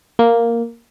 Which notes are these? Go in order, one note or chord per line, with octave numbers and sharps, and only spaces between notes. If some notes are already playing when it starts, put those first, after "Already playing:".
A#3